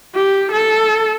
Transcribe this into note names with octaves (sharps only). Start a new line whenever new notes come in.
G4
A4